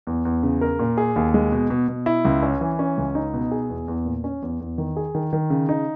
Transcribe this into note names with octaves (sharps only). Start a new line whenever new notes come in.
E2
E2
C#3
A#4
A#2
G#4
D#2
G#3
B2
B2
B2
E4
C#2
C#4
E3
C#4
C#2
D#4
B2
G#4
E2
E2
A#2
C#4
E2
E2
D#3
G#4
D#3
D#3
C#3
D#4